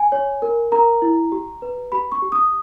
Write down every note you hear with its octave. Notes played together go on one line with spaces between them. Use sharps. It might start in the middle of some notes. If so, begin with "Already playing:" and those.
Already playing: G#5
C#5
A#4
A#4 A#5
E4
G4
B4
G4 B5
C#6
G4
D#6